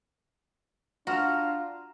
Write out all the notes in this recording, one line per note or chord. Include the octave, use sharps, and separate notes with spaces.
D4 F4 F#4 A#5 F6 E7